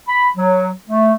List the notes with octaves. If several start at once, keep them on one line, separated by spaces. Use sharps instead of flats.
B5
F#3
A3